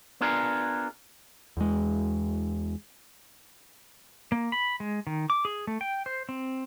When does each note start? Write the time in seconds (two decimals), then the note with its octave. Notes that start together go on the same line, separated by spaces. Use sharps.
0.21 B3 D4 F4 G#4 A#4
1.57 E2 G#3
4.32 A#3
4.52 B5
4.80 G#3
5.07 D#3
5.30 D6
5.45 G#4
5.67 A3
5.81 G5
6.06 C5
6.29 C4